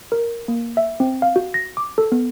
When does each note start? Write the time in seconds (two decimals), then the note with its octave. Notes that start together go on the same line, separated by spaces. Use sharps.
0.12 A#4
0.48 A#3
0.77 E5
1.00 C4
1.22 F5
1.36 F#4
1.54 A#6
1.77 D6
1.98 A4
2.12 B3